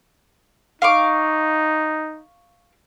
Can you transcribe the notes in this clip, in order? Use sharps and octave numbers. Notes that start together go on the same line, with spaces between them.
D#4 F5 C#6 D6